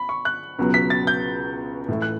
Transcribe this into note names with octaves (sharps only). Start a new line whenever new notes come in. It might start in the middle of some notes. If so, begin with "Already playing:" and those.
Already playing: B5
C#6
F#6
C#2 B2 F#3
B6
A6
G6
A2 E3 A3 E4
F#6